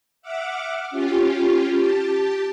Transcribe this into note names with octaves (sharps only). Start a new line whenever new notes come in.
E5 F#5 D6 F6
C#4 F4 G4
G4 A5